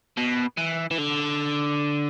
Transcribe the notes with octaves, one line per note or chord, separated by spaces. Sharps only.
B2
E3
E3
D3